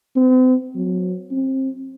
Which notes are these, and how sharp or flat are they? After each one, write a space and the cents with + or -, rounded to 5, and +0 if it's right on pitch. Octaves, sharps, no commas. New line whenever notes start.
C4 -40
F#3 -20
C4 +25